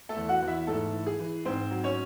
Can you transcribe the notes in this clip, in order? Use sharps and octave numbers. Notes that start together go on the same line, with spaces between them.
A3 A4
E2
F#4 F#5
E2
E4 E5
G#2 A3 A4
E3
G#4
E3
G#2 C4 C5
F#3
C#4 C#5